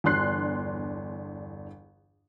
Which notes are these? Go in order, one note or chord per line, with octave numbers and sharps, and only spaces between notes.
G1 E2 D4 C6 F#6 C7